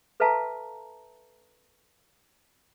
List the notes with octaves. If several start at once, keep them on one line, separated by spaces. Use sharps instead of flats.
A4 B4 E5 F5 A5 A#5